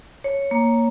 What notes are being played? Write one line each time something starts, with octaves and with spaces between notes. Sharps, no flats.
C#5
A#3